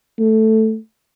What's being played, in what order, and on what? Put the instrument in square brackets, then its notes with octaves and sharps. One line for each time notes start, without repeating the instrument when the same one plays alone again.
[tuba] A3